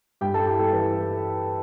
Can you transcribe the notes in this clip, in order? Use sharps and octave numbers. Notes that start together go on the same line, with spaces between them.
G2 G4 G5
A4 A5
E4 G4 G5
A4
E3 B4